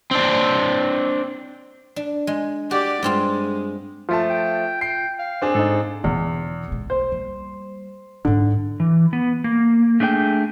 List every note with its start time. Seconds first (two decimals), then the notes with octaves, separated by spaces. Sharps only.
0.11 C4 D4
1.96 D4
2.27 G#3
2.71 F#4 G4 D5
3.03 G2 G#3 C4 F4
4.09 F3 A3 F4 A5
4.30 G5
4.81 G5 C7
5.19 F5
5.42 C4 D4 G#4
5.55 G#2 D#4 A4
6.04 E2 B2 D3
6.68 B1 G#3
6.90 C5
7.12 G3 A#3
8.25 G#2 D3 G3
8.80 E3
9.13 B3
9.44 A#3
10.00 A3 D4 G#4 D5 G5